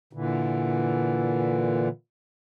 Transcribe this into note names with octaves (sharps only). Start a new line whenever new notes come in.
A#2 D3 E3